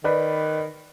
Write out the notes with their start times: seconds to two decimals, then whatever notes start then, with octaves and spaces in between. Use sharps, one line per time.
0.04 D#3 B4 D5